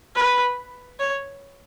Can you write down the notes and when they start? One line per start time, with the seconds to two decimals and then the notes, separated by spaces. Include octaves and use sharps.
0.15 B4
0.99 C#5